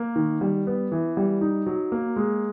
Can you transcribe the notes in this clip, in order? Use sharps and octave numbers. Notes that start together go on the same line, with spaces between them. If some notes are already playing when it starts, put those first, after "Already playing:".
Already playing: A#3
D#3
G3
B3
E3
G3
D#4
F#3
A#3
G#3